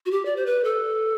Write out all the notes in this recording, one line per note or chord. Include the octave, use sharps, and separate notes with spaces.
F#4
G4
D5
C5
B4
A4